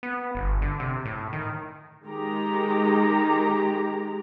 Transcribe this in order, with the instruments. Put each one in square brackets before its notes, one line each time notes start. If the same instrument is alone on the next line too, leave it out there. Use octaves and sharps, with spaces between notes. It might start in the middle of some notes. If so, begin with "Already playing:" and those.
[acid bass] B3
G1
D3
C3
A2
D#3
[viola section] D#3 G#3 G4 A#5